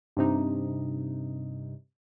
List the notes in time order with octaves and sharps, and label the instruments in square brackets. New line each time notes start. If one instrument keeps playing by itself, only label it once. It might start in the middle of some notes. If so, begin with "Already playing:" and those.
[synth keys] G2 C3 D#4